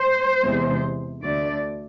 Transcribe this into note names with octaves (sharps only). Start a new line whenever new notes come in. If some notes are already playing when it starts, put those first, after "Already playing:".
Already playing: C5
E2 C3 G#3
D2 D3 A3 D5